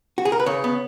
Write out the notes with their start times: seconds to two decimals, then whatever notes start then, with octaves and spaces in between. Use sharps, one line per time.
0.18 F#4
0.25 G#4
0.32 A#4
0.40 B4
0.46 C#3 C#5
0.64 B3